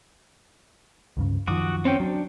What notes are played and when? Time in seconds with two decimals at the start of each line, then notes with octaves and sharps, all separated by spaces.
1.17 C#2 G2 C#3
1.47 F#2 D#3 F3 F#4 D6 D#6
1.85 C4 C#4 G5
2.00 F#3 D4